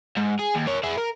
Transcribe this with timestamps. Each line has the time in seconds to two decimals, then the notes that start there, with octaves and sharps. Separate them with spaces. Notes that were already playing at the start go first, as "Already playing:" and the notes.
0.17 G#2
0.39 G#4
0.55 D#2
0.67 A#4 C#5
0.83 E4 G#4
0.98 A#4